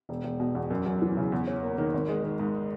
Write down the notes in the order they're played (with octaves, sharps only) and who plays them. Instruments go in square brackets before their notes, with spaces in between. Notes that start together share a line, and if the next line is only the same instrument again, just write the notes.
[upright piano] E1
E1
B2
E2
F#2
F#2
E3
C#3
E2
C#4
A#3
D#3
G#1
G#3
D#3
G#2